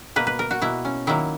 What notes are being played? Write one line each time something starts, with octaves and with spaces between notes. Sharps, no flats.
B2 A#3 B4
B4
A#4
F#4
B2 A#3 E4
C#4
D#3 F#3 A#3 E4